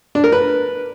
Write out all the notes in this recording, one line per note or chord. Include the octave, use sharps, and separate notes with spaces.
D4
A#4
B4